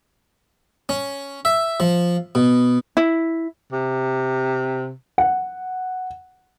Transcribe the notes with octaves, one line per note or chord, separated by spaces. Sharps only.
C#4
E5
F3
B2
E4
C3
F#5